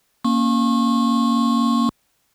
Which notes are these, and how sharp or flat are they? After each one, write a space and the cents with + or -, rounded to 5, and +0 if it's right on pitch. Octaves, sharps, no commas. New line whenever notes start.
A#3 +0 C#4 +0 C#6 -35